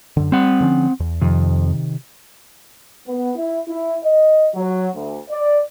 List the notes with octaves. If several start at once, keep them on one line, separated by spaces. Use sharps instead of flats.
F#2 D3
G3 C4 F#5
D3 F3 C#4
E2
F2 C3 D#3
B3
E4
E4
D#5
F#3
D2
D5